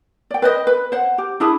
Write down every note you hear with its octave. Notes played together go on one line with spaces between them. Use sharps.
D5 G5
B4 C5 D#5
B4
C5 F#5
G4
D4 E4 G#4